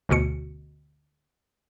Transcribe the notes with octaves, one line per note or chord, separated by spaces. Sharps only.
G1 D2 B2 C#7